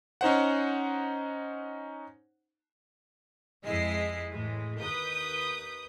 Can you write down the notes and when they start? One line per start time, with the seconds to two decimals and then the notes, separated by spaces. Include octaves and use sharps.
0.21 C#4 D#4 C5 F#5
3.65 F2 G#3 E4 D#5 C7
4.31 A2 E3 G#3
4.80 D#2 B4 D#6 G6